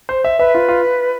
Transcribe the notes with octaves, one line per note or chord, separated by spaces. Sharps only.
C5
E5
B4 E5
F4
F4